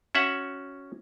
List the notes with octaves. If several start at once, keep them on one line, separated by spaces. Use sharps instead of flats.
C#4 F#4 E5 F#5